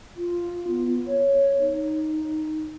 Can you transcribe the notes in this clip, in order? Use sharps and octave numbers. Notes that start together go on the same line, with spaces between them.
F4
B3
C#5
D#4